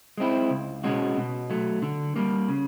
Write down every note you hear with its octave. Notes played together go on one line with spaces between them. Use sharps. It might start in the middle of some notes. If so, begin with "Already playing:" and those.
G#3 C4 E4
C#2
B2 G#3 C#4 F#4
B2
F#3 A3
D3
G3 A#3
C#3